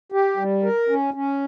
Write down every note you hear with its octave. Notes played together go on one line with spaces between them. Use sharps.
G4
G3
A#4
C#4
C#4